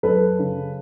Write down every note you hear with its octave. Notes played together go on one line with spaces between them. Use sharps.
F#2 A4 B4
C#3